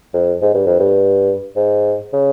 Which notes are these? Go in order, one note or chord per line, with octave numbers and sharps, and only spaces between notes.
F2
G#2
G2
F2
G2
G#2
C#3